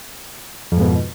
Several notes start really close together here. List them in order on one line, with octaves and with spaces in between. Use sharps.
F2 G#2 B2